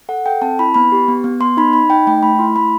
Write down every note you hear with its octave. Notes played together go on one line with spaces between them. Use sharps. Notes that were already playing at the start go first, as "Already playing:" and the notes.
A4 F#5
A4 G5
C4 A5
E4 B5
B3 B5
G4
B3
B3
B3 C6
D#4 B5
D#4 B5
D#4 G5
A3 G5
A3 B5
E4 C6
A3 B5